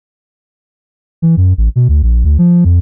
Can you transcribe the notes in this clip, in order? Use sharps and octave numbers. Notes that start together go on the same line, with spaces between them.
E3
F#2
A1
B2
D2
A#1
D2
F3
F2